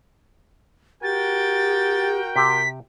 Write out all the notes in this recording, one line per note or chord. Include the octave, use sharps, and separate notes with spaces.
F#4 G4 A#4 G5 A6
C3 G4 B6